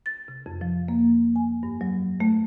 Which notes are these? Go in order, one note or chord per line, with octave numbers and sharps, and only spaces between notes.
A6
C3
F2
F3
A#3
G#5
G2
F#3
A3